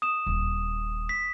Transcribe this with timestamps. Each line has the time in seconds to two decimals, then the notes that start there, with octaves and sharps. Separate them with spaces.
0.02 D#6 E7
0.27 D#1
1.09 B6